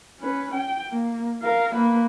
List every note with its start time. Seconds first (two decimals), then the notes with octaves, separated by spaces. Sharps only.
0.20 C#4 B4
0.54 G5
0.91 A#3
1.42 A#4 F5
1.75 A#3 B4